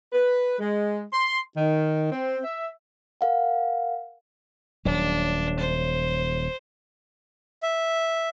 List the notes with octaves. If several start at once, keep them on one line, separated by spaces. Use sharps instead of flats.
B4
G#3
C6
D#3
C4
E5
A#4 F5 F#5
D#1 F#3 D4
C5
E5